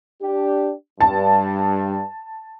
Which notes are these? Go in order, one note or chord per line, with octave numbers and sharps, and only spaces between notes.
D4 G4
G2 A5